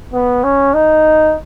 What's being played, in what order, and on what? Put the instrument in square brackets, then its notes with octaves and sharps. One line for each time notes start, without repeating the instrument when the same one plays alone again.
[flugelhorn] B3
C#4
D#4